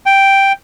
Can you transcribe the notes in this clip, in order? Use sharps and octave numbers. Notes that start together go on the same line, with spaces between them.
G5